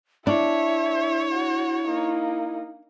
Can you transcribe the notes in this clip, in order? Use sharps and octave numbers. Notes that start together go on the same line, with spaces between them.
D4 E4 C#5 E5
F#4
A#3 D#4